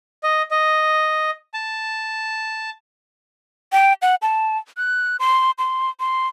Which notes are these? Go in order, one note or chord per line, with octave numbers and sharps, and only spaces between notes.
D#5
D#5
A5
G5
F#5
A5
F#6
C6
C6
C6